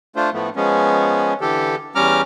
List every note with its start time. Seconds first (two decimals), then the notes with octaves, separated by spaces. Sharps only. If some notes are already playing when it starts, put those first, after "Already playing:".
0.16 A3 D4 F4 C5
0.33 A2 F3 A3 B3
0.56 F3 G#3 B3 C#4
1.41 D3 E3 G4 A4
1.95 E2 G3 C#4 A#5 D6 F6